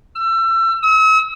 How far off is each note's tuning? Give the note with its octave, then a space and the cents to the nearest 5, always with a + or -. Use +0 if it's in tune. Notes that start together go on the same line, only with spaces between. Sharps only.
E6 +30
E6 -45